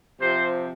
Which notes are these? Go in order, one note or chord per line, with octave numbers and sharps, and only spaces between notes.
C3 F3 C5